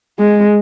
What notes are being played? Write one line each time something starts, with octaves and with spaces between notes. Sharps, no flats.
G#3